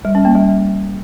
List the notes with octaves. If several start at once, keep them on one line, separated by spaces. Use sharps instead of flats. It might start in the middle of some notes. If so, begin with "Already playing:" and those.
G3
C#4
A#3
G3